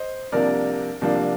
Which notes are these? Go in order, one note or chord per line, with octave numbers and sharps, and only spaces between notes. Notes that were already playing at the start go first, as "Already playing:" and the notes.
Already playing: C5 D#5
C2 C3 F3 A#3 D4 A#4 D5
C2 C3 F3 A#3 D4